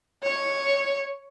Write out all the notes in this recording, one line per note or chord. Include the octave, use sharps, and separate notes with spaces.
C#5